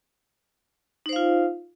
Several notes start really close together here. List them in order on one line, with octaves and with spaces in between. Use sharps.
D#4 C5 F5 F4